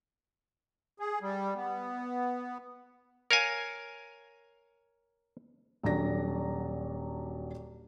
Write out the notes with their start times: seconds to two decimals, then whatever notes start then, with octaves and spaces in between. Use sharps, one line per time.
1.00 G#4
1.22 G3
1.55 B3
3.31 A#4 C#5 F5 G#5
5.83 D#1 F#3 D4 D5 A#6